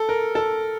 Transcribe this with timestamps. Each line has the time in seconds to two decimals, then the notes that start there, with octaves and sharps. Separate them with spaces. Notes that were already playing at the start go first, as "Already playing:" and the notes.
Already playing: A4
0.09 A#4
0.35 A4